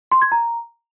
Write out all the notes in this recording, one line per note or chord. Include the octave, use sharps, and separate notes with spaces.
C6
G#6
A#5